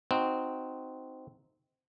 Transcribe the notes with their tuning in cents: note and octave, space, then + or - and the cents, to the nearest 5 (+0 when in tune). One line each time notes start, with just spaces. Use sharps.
C4 -10 D#4 +5 F#4 -10